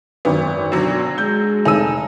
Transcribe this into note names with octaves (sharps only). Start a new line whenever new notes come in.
G#1 F#2 B3
B2 D3 F#3
G#3 G6
F1 D#4 G#5 A5 E6 D#7